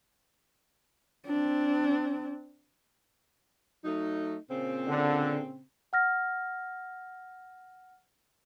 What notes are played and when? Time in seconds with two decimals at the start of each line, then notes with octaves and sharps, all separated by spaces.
1.26 C4 D4
3.84 F#3 A3 D#4
4.49 A#2 C#3 C4
4.87 D3
5.93 F#5 F6 A#6